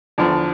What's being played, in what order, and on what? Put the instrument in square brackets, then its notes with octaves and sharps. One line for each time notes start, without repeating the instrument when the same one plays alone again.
[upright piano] E2 D3 F3